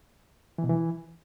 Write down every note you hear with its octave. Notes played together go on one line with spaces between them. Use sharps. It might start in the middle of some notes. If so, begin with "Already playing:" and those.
E3
B2
E3